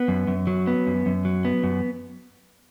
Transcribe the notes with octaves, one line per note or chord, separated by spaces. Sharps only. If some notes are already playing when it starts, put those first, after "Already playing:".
Already playing: B3
F#2
F#2
F#3
B3
F#2
F#2
F#3
B3
F#2